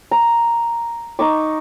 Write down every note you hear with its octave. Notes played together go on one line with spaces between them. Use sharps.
A#5
D#4 C#6 D6